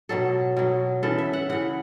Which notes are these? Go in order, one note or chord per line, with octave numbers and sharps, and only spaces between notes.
B2 F#3 A4
B2 F#3
C#3 E3 A4
E5
F#5
C#3 E3 F#5